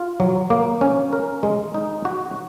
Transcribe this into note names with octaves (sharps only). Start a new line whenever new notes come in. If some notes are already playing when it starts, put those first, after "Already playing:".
Already playing: F4
F#3
A#3
C#4
A#4
G#3
D#4
F#4